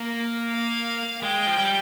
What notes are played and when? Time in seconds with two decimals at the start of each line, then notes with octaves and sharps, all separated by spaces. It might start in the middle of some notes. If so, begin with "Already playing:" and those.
Already playing: A#3 A#4
0.51 F5
1.23 G#3 G5
1.47 F3
1.58 G3